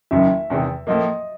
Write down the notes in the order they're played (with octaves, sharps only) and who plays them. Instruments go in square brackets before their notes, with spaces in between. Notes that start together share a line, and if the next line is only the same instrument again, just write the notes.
[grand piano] F#1 F#2 D#3 [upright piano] E5
[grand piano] E2 C3 D#3 G#3
[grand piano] A2 F3 A#3 [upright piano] D#5